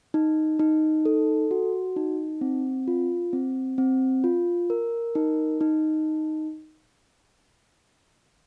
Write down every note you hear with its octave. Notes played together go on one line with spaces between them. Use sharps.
D#4
D#4
A4
F#4
D#4
C4
F4
C4
C4
F4
A#4
D#4
D#4